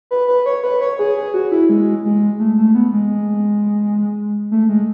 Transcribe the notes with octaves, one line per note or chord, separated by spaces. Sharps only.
B4
B4
C#5
B4
C#5
G#4
G#4
F#4
E4
G#3
G#3
A3
A3
B3
G#3
A3
G#3